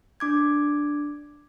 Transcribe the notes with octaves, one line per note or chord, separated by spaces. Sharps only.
D4 D6 G#6